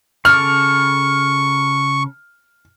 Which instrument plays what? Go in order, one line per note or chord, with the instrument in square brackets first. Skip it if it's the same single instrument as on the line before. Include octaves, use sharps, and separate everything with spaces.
[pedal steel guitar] C#3 A4 D6 [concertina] C#6 [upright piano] F6